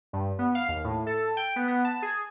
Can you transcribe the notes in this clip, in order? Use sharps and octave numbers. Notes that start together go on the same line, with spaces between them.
G2
B3
F5
D#2
A2
A4
G5
B3
B3
A5
G#4